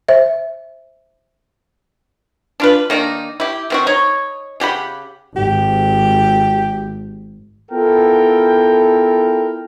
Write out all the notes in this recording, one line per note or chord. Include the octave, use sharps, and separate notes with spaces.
C5 E5
D4 F4 B4
D#3 A#3 D4 D#4
E4 G4
D#3 C4 F#4
D#4 C#5
C#3 G4 F#5 B5
G#1 G4
B3 E4 F4 A4 A#4 G5